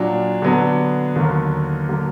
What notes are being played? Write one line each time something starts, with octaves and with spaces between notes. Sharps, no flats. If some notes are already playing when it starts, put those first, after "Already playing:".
Already playing: A#2 F#3 D4
D3 F#3 B3 D4
D#2 D3 F#3 A#3
D3 F#3 A#3